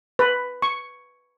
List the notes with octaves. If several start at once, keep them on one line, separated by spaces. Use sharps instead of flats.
B4
C#6